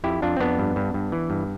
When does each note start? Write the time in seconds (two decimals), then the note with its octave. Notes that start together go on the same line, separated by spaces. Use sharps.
0.04 F2 E4 G4
0.22 F2 D4 F4
0.37 C4
0.40 F2 B3 D4
0.59 G2
0.76 G2
0.94 G2
1.12 E3
1.30 G2